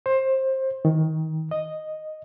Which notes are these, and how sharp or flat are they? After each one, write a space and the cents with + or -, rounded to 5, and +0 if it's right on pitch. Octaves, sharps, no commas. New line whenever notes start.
C5 +20
D#3 +25
D#5 -5